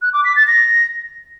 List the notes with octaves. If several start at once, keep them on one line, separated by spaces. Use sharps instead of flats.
F#6
D6
B6
A6
A#6